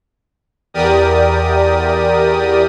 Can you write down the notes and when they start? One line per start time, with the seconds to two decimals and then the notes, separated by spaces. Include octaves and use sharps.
0.74 E2 G4 A#4 D5 D#6